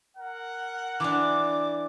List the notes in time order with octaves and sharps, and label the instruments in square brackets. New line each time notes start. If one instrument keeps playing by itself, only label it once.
[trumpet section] A#4 F#5
[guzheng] E3 D4 [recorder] D6